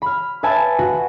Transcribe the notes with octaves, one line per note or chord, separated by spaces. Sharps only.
B5 F6
B4 E5 G#5 A5 B5
F#4